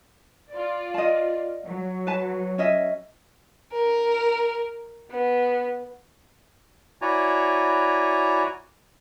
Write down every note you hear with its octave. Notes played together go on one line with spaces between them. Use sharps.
F4 D5
D#5 A5
F#3
B4 A5
C#4 D#5 E5
A#4
B3
E4 F#4 C#5 D5 G#5 A#5